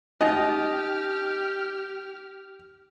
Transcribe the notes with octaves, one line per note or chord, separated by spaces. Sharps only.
C#4 D#4 G4 D#5 F6